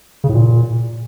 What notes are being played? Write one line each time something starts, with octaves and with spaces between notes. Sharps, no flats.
C#3
A2
A#2